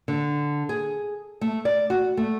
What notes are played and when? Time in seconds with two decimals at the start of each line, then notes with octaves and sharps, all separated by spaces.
0.08 D3
0.69 G#4
1.41 A3
1.65 D5
1.90 F#4
2.17 A3